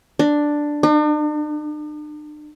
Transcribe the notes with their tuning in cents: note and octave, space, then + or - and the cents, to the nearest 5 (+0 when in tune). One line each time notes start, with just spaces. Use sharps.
D4 +5
D4 +45